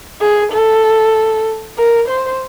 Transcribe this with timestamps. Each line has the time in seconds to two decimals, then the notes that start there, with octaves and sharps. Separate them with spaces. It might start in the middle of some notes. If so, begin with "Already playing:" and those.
0.21 G#4
0.53 A4
1.78 A#4
2.09 C5